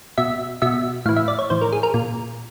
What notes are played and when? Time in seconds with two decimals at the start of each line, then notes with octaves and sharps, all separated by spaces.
0.18 B2 E5
0.62 B2 E5
1.06 A2 F5
1.09 E3
1.16 E5
1.28 D5
1.39 C#5
1.50 A2 E3 C5
1.61 A#4
1.73 G#4
1.83 A#4
1.94 A#2